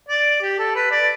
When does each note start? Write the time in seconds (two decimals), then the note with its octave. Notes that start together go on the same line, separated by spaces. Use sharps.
0.08 D5
0.42 G4
0.59 A4
0.75 B4
0.91 D5